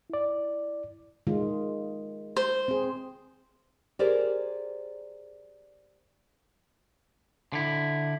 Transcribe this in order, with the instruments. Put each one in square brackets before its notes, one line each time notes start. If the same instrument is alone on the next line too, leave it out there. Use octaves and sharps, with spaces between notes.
[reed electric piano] E4 D5
[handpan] D#3 G#3 F4
[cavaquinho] C5
[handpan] C4 G#4
[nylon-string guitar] G4 G#4 A#4 C5 D5
[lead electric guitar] D3 E4